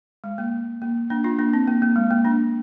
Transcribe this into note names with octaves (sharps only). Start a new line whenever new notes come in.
G#3
A#3
A#3
A#3 D4
D4 F4
A#3 D4
C4
A#3
A#3
G#3
A#3
A#3 D4